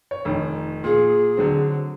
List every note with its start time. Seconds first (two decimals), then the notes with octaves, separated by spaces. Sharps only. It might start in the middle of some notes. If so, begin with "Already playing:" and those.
0.11 C#5
0.25 F1 D#3
0.84 A#2 G#4
1.37 D3 F#3 C4